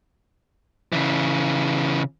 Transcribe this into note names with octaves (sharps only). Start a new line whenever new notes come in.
C#3 E3